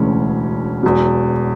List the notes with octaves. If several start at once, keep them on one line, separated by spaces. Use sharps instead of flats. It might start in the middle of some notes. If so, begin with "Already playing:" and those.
Already playing: E1 D2 C#3 E3 C#4
E1 E2 B2